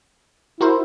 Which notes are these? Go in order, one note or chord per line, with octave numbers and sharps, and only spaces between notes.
E4 F#4 A#4 C5